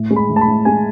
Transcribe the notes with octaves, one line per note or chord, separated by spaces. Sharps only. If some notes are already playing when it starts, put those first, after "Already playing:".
Already playing: A2
G#3
B5
A2
A5
B5
A2
G#3 G#5